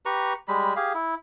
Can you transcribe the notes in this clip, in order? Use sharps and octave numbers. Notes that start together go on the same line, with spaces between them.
G4 B4 A#5 C#6
G3 G#3 B5
G4 G#4 F5
E4